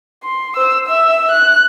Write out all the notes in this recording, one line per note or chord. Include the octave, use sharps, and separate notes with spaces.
C6
C5 E6
E5 E6
F#6